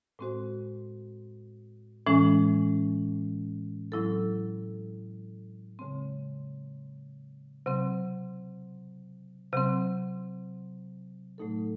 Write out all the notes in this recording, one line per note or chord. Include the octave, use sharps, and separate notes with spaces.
A2 G#3 C4 F#4 C5
A2 E3 G#3 C#4
A2 F#3 C4 E4 A4
C#3 G#3 C4
C3 F#3 C4
C3 F#3 C4
A2 F#3 A3 D#4 A4